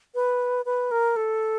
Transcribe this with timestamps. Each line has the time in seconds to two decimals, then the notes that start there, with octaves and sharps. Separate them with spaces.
0.15 B4
0.65 B4
0.91 A#4
1.16 A4